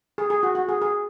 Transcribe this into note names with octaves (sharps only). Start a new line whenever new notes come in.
G#4
G#4
F#4
F#4
G#4
G#4